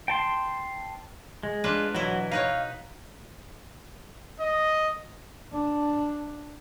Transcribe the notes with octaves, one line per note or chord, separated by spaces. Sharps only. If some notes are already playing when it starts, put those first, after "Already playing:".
G5 A5 C6
G#3
D4 F4 B4
B2 E3 F#3 E4
D#4 B4 C#5 F5
D#5
D4